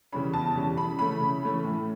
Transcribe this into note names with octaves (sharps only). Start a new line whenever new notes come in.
C#3 E3 G3 C#4 B5
E2 A5
C#3 E3 G3 C#4
C#3 B5
E3 A3 C#4 B5
C#3
E3 A3 C#4
A2